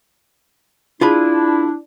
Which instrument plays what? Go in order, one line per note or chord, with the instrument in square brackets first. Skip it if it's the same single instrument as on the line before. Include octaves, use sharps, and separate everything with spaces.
[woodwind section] D4 E4 [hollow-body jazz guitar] F4 G#4 B5